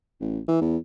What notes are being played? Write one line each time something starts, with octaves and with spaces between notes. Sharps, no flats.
A1
E3
E2